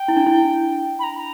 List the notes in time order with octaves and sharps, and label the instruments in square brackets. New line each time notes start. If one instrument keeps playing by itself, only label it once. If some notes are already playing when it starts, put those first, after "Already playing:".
Already playing: [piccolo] G5
[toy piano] E4
D4
E4
[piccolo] B5
A#5